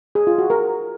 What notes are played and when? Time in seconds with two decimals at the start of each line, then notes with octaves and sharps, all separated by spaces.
0.15 G#4
0.27 F4
0.38 F#4
0.50 A#4